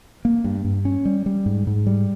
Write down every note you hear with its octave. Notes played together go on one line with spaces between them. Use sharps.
A#3
G2
G2
C#4
G3
G3
G#2
G#2
G3